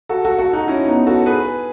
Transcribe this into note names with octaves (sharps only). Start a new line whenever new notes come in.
F#4 A4
F#4 A4
F#4 A4
D#4 F#4
C#4 E4
B3 D#4
F#4 A4
G#4 B4